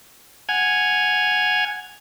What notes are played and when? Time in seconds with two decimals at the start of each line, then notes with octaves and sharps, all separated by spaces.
0.49 F#5 G#5 F6 G#6